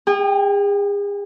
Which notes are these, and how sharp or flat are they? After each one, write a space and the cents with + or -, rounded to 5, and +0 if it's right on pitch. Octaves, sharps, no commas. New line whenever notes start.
G#4 -40 G5 +0